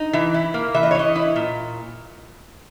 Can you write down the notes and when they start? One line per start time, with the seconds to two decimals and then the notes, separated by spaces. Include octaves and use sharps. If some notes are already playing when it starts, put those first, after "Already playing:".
Already playing: D#4
0.13 E3 E5
0.34 E4
0.54 A#3
0.74 E3 E5
0.83 D#5
0.91 C#5
0.95 E3 D#5
1.16 E4
1.36 A#2